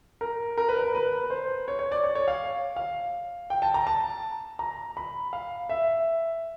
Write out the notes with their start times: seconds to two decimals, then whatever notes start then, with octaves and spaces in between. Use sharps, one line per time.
0.21 A#4
0.58 A#4
0.69 B4
0.79 A#4
0.95 B4
1.30 C5
1.68 C#5
1.79 C#5
1.92 D5
2.04 C#5
2.15 C#5
2.28 F5
2.76 F5
3.50 G5
3.62 A5
3.74 A#5
3.87 A5
4.59 A#5
4.97 B5
5.33 F5
5.69 E5